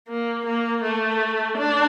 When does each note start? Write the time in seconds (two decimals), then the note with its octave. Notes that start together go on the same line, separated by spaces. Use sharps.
0.09 A#3
0.46 A#3
0.83 A3
1.58 D4